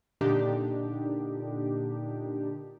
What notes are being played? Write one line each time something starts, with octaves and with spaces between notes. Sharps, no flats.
A#2 D3 D4 D#4 G4